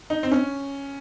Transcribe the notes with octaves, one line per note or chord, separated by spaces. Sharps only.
D#4
C4
C#4